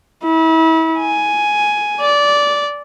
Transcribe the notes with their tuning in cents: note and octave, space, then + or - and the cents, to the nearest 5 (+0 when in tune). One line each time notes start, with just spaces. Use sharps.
E4 -35
G#5 +5
D5 -15